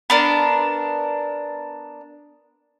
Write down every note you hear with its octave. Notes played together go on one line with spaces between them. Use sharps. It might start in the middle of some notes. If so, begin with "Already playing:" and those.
B3 D4 A#4